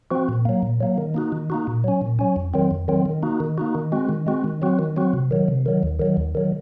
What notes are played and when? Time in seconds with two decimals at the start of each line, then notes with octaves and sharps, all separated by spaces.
0.11 F3 C4 F#4
0.29 A#2
0.45 F#3 A#3
0.63 A#2
0.81 F#3 A#3
0.98 D#3
1.14 A#3 D#4 F#4
1.32 D#3
1.50 A#3 D#4 F#4
1.67 A#2
1.84 F#3 C#4
2.01 A#2
2.19 F#3 C#4
2.36 F2
2.54 D#3 F#3 C4
2.71 F2
2.88 D#3 F#3 C4
3.06 D#3
3.23 A#3 D#4 F#4
3.40 D#3
3.58 A#3 D#4 F#4
3.75 D#3
3.92 G#3 C4 F#4
4.09 D#3
4.27 G#3 C4 F#4
4.44 D#3
4.62 F#3 C4 F#4
4.79 D#3
4.96 F#3 C4 F#4
5.13 C3
5.31 D#3 F#3
5.48 C3
5.66 D#3 F#3
5.83 D#2
5.99 D#3 F#3
6.17 D#2
6.35 D#3 F#3